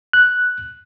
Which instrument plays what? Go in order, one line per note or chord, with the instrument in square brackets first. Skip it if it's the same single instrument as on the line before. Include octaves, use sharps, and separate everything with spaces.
[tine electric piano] F#6